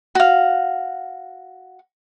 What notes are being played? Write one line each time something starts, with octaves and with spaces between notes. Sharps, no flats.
F#4 F5